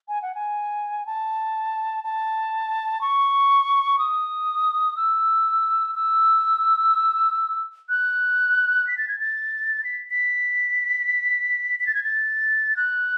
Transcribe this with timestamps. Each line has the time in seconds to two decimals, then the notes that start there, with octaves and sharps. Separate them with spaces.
0.08 G#5
0.22 F#5
0.35 G#5
1.06 A5
2.04 A5
3.01 C#6
3.99 D#6
4.96 E6
5.95 E6
7.89 F#6
8.87 B6
8.98 A6
9.08 G#6
9.19 A6
9.84 B6
10.10 B6
11.80 B6
11.87 A6
11.95 G#6
12.04 A6
12.77 F#6